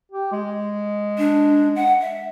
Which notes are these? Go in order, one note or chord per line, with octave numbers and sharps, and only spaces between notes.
G4
G#3
D4
F#5
E5